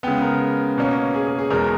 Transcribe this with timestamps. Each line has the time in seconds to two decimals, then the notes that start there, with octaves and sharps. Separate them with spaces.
0.03 C#3 G#3 B3 G5
0.22 A#4
0.78 B2 A#3 C#4
1.14 G#4
1.27 G#4
1.39 G#4
1.50 E2 B2 G#3 A#4